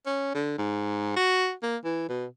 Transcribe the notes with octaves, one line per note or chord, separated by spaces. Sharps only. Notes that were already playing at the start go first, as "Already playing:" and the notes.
C#4
D3
G#2
F#4
A#3
E3
B2